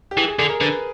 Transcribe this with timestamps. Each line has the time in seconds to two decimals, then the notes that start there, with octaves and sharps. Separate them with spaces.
0.11 G4
0.17 E3 G#4
0.28 G#4
0.39 D3 G#4
0.50 A#4
0.60 D3 B4